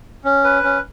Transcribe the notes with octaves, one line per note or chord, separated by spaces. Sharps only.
C#4
B4
C#4